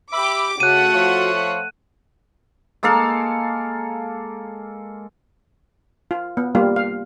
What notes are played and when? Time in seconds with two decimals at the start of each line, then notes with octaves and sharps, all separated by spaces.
0.13 G4 E5 B5 D6
0.60 C#3 A3 F#4 F#5 F#6 D#7
0.94 F3 F4 C#5
2.83 G#3 A#3 A4 F5
6.11 F4
6.37 B3
6.55 G3 A#3 F4
6.76 F5